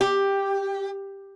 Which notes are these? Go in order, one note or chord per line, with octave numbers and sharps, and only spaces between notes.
G4